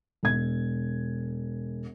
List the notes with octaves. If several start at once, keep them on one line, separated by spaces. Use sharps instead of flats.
E1 G#6